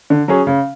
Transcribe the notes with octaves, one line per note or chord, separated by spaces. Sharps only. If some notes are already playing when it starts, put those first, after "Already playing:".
D3
F#3 C#4 G#4
C#3